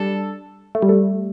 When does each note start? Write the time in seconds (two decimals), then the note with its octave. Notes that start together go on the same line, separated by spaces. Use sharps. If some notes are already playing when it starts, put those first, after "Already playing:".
Already playing: G3 D4 A4
0.75 A3
0.82 G3
0.89 A3